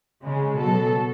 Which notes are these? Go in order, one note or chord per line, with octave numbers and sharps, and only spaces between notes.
C#3 G#3
B2 F#3 A4